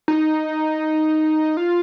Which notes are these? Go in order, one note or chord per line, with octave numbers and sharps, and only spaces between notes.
D#4
F4